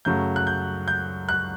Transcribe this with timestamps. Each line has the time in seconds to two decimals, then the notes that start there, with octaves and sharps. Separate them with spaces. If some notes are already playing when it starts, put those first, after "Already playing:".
0.05 F#2 C#3 F#3 A3 G6
0.36 F#6
0.47 G6
0.88 G6
1.29 F#6